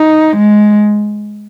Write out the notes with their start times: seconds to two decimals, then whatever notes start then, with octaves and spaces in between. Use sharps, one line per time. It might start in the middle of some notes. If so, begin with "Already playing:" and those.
Already playing: D#4
0.36 G#3